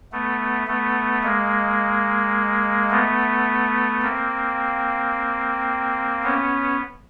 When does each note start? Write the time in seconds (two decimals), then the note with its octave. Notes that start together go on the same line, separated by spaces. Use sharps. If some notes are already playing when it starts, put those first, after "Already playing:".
0.12 A3 B3
0.67 A3 B3
1.23 G#3 A#3
2.90 A3 B3
4.02 A#3 C4
6.23 B3 C#4